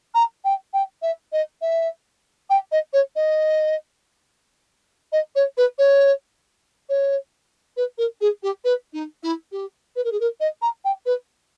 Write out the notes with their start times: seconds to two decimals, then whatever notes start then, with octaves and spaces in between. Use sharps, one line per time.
0.14 A#5
0.44 G5
0.73 G5
1.02 E5
1.32 D#5
1.61 E5
2.50 G5
2.72 D#5
2.93 C#5
3.15 D#5
5.12 D#5
5.35 C#5
5.57 B4
5.78 C#5
6.89 C#5
7.77 B4
7.98 A#4
8.21 G#4
8.43 G4
8.64 B4
8.93 D#4
9.23 E4
9.52 G4
9.96 B4
10.04 A#4
10.12 G#4
10.20 A#4
10.40 D#5
10.62 A#5
10.84 G5
11.06 B4